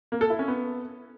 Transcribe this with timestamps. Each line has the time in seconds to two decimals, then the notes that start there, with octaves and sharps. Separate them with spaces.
0.12 A#3
0.21 A4
0.30 E4
0.39 C#4
0.48 B3